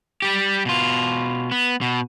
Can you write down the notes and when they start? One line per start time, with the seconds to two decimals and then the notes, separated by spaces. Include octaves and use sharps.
0.22 G3 G4
0.65 B2 F4
1.51 B3
1.81 B2